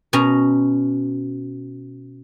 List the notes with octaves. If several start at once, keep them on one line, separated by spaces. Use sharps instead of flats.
B2 C#4 A#5